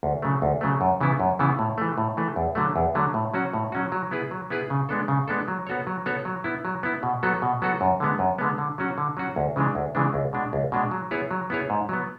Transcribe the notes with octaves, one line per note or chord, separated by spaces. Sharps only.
D2
C#3 F#3 A3
D2
C#3 F#3 A3
F#2
C#3 E3 B3 E4
F#2
C#3 E3 B3 E4
A2
E3 A3
A2
E3 A3
E2
D3 F#3 A3
E2
D3 F#3 A3
A2
F#3 C#4 F#4
A2
F#3 C#4 F#4
F#3
B3 E4 G#4 B4
F#3
B3 E4 G#4 B4
C#3
G#3 B3 D4 A4
C#3
G#3 B3 D4 A4
F#3
B3 F#4 A4 C#5
F#3
B3 F#4 A4 C#5
F#3
B3 E4
F#3
B3 E4
B2
F#3 B3 F#4 A4
B2
F#3 B3 F#4 A4
F#2
D3 G#3 B3
F#2
D3 G#3 B3
D3
F#3 C#4 F#4
D3
F#3 C#4 F#4
D2
C#3 E3 G#3 D4
D2
C#3 E3 G#3 D4
C#2
B2 G#3 D4
C#2
B2 G#3 D4
F#3
B3 E4 G#4 C#5
F#3
B3 E4 G#4 C#5
G#2
F#3 B3